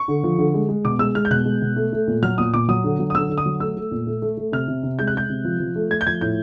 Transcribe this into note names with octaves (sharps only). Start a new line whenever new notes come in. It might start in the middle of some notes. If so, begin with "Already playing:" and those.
Already playing: C#6
D3
F3
D3
G#3
G#3
B2 D6
G#3 E6
G#3 F6
G6
B2 F#6
G#3
B2
A3
A3
A#2
F#3 F6
A#2 D#6
A#2 D6
F#3 D#6
D3
F#3
D#6
D3 E6
D3
D#6
F#3
A3 E6
A3
A#2
A3
A3
A3
C3 F6
C3
C3
G#3 G6
F#6
G#3 G6
C3
F3
F3
A3
A3 G#6
G6
F3 G#6
A2 G6